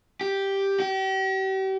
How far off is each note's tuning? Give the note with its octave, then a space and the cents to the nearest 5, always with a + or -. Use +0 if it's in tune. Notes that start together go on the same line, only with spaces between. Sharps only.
G4 +0
G4 -40